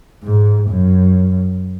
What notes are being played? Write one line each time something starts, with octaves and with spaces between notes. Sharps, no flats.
G#2
F#2